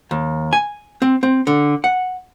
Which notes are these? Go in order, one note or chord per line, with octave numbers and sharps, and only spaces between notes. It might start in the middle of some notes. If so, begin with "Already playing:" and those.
D#2
G#5
C4
C4
D3
F#5